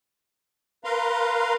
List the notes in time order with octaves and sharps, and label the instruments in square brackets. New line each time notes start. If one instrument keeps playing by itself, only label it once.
[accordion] A#4 B4 F5 A#5 C6